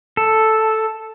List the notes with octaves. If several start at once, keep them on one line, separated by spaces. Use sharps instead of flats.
A4